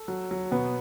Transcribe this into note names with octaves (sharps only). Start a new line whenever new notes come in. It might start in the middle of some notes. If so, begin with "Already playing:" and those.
Already playing: A4
F#3
F#3
B2 B3